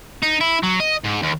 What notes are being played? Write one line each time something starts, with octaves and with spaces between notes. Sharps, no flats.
D#4
E4
F#3
D#5
G#2
D#2